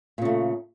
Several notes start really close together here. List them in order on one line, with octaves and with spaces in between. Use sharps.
A#2 C#3 A3